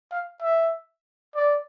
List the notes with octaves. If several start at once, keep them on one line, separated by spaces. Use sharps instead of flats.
F5
E5
D5